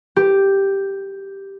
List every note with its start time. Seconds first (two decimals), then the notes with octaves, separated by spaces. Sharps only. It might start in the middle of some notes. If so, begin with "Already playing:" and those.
0.16 G4